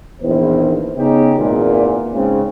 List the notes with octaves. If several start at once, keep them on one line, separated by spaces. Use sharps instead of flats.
A#1 E2 D#3 E4 B4 C5
C#3 B3 C#4 D#4 G4
G#1 E2 A#2
G#2 C#3 C4